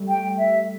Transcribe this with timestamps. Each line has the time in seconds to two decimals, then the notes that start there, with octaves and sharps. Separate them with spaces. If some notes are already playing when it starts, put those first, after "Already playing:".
Already playing: G3 A3
0.08 G5
0.38 E5